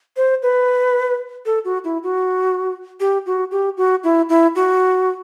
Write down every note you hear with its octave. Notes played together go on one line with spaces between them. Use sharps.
C5
B4
A4
F#4
E4
F#4
G4
F#4
G4
F#4
E4
E4
F#4